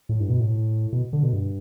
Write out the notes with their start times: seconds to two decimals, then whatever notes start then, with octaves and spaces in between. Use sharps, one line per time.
0.09 A2
0.20 G2
0.29 B2
0.40 A2
0.93 B2
1.13 D3
1.23 B2
1.33 G2